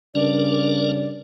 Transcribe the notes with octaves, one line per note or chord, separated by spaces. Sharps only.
G2 C#3 C#4 D4 A#4 D5